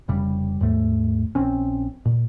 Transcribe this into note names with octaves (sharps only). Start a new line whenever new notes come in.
F1 C#3 G3
D#2 G#2 A3
A#1 C4 C#4
A#2